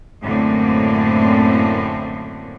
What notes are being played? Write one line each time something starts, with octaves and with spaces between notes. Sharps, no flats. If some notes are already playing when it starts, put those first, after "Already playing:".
F#2 A2 D3 A3 A#3 C4